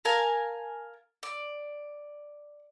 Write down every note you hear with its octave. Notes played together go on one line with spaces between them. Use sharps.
A#4 F5 G#5 A5
D5